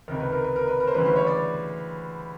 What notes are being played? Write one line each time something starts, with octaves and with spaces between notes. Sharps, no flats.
C#2 C3 D#3 A#4
B4
A#4
B4
A#4
B4
A#4
C5
D2 C#3 E3 G3 B4
C5
C#5
D5